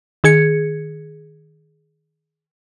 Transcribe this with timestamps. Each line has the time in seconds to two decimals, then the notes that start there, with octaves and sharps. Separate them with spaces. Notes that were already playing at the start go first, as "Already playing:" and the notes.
0.24 D#3 G#4 G#6 C#7